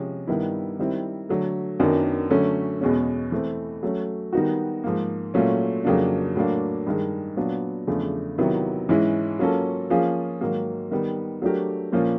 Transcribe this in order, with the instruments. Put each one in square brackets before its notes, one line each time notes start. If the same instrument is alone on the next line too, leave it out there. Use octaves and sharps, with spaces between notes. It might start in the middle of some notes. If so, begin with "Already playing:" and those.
Already playing: [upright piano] C3 F3 G#3 C#4
G2 D#3 G3 B3 E4
D#3 G3 C4 E4
D3 F#3 A3
F#2 D#3 F#3 B3 D4
D3 F#3 A3 C#4
E2 B2 G#3 C#4
E3 A3 C4
F#3 A3 C#4
D#3 G3 B3 D#4 F#4
G#2 F3 A#3
A#2 F#3 A3 C#4 F4
F2 C#3 F#3 A#3 D4
A2 F#3 A#3 D4
G2 D#3 G#3
A#2 F#3 B3 D4 F4
E2 C#3 F3 A3 D4
C3 D#3 F#3 B3 E4
G#2 E3 G#3 C#4 E4
F#3 A#3 C#4 F4 A4
F3 A#3 C#4 F4 G#4
G#2 D#3 F#3 A#3
D#3 G3 B3
F#3 A3 D4 G4 A#4
A#2 F3 A#3 C#4 F4